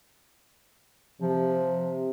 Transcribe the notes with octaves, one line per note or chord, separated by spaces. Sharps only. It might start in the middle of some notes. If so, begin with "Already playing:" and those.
C3 F3